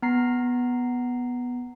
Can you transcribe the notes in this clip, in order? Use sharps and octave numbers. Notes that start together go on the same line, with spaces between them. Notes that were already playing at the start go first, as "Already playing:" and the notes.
B3 A#5 C7